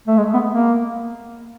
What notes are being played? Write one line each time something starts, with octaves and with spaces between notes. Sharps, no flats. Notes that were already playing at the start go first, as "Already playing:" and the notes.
A3
G#3
B3
A#3